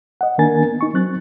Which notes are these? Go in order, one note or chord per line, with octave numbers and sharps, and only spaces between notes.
D#5 F#5
D#3 A#3 D4 A#4 G#5 A6
B3
D#4 C#6
F#3 C4 F#6 A6